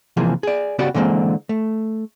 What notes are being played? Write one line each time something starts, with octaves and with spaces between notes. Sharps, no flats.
C3 E3 F3 A#3 G#4
G#4 D5
C#3 B3 F#4 G4 D5 F#5
D3 E3 G#3 A#3 C4
A3